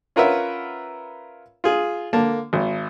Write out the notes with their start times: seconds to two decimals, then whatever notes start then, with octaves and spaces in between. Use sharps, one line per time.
0.16 C#4 F4 A#4 B4 E5 F#5
1.64 F4 G#4
2.13 D3 A#3 A5
2.53 G#1